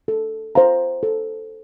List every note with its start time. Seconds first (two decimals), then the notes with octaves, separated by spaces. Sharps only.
0.08 A4
0.55 C5 F5 A#5
1.03 A4